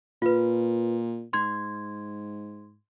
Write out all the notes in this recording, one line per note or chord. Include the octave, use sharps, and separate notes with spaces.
A#2 F4 B4
G#2 C6 G#6